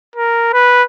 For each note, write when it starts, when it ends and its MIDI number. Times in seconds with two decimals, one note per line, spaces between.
0.16 0.49 70
0.53 0.83 71